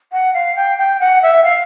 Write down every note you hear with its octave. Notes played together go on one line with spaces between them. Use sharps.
F#5
F5
G5
G5
F#5
E5
F5